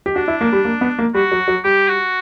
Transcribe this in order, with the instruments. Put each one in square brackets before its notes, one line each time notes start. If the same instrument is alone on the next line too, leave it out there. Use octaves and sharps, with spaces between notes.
[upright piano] G4
[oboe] D4 [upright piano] F#4
[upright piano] E4
A#3
G3
A#3
B3
A#3
[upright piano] G3 [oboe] F#4
[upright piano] F#3
F#3
[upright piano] G3 [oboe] G4
[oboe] F#4